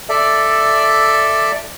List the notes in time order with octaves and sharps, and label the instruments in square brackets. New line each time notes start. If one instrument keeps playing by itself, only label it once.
[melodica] A4 D5 E5